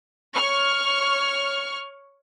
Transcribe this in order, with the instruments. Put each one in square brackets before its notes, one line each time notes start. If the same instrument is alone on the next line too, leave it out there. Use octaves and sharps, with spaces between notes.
[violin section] C#5 C#6 F6